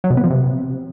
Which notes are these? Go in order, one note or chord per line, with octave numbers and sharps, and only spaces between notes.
F#3
B2
B3
F3
C3